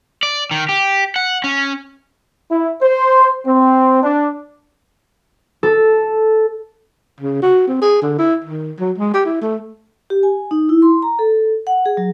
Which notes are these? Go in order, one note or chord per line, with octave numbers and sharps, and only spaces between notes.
D5
D#3
G4
F#5
C#4
E4
C5
C4
D4
A4
C#3
F#4
C4
G#4
D3
E4
D#3
F#3
G#3
G4
E4
A3
G4
G#5
D#4
E4
C6
A#5
A4
F#5
G#4
F#3